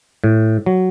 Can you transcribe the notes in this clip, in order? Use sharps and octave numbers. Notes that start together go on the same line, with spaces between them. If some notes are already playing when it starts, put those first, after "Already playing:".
A2
F#3